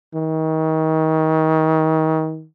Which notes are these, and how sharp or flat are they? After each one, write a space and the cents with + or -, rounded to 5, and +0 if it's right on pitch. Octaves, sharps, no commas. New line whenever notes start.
D#3 +30